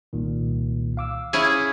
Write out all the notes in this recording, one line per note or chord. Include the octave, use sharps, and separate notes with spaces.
C2 A#2 D#3
F5 D6 E6
C#4 E4 G#4